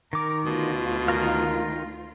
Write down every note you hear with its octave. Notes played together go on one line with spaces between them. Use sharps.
D#3 A#4 D6
D2 B2 F4
D#3 A#4 F5